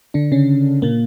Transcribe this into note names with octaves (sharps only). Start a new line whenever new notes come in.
D3 D4
C#3 C#4
A#2 A#3